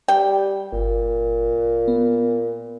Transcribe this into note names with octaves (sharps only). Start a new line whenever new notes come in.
G3 G5
G1 A#2
B3